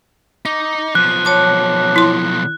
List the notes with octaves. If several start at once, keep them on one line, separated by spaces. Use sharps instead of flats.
D#4 D6
B1 F3 F#6
C#5 A5 D6
E4 C6